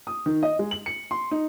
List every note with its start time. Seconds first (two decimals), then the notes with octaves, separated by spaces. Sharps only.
0.07 D#6
0.26 D#3
0.43 D#5
0.59 G#3
0.71 F#7
0.86 C#7
1.11 C6
1.31 D#4